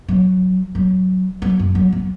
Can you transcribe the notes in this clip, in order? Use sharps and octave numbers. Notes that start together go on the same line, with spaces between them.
F#3
F#3
F#3
F#2
F#3
F#3